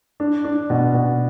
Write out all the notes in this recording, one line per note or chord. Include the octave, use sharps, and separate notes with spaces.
D4
D4
B2
B2